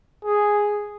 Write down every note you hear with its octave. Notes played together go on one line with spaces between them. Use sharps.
G#4